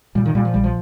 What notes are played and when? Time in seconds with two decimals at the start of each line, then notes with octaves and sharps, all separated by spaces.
0.15 A#2 G3
0.26 D#3
0.35 A#2 G3
0.45 F3
0.54 A#1 G3
0.64 F3